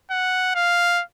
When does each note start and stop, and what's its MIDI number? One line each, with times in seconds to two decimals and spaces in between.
0.11 0.55 78
0.55 1.03 77